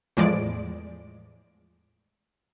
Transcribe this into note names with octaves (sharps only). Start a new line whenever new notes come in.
E2 A2 F3 G#3 D5 D7